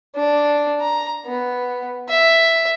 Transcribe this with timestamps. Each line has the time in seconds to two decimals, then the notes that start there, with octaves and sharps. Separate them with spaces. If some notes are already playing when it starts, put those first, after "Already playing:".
0.16 D4
0.81 A#5
1.26 B3
2.09 E5